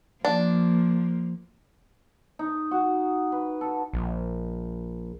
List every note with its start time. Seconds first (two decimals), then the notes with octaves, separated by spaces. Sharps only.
0.25 F3 A#3 D4
2.39 D#4
2.71 F#4
3.32 B4
3.61 A4
3.93 A#1